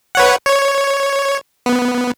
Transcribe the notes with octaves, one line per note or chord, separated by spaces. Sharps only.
B4 C#5 F#5
C#5
B3